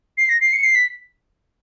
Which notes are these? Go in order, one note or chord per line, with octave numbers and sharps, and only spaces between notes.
C7
A#6
C7
C#7
C7
B6